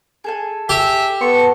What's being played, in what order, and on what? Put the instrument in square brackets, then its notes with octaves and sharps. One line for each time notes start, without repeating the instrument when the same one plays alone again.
[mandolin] G#4 A4 G#5
[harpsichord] G4 [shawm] E5
[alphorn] B3 [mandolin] A4 C6 [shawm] C#6